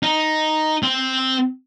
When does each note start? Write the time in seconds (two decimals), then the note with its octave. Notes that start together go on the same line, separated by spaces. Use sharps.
0.03 D#4
0.83 C4